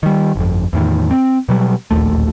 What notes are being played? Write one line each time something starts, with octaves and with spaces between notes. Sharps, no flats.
D#3 G3
G1 F2
E2 A2 D#3
C4
B2 F#3 G3
D1 A#1 D#2 A3